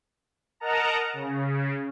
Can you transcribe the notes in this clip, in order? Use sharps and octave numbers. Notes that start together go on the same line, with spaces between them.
A#4 D#5 F#5 A5 A#5
C#3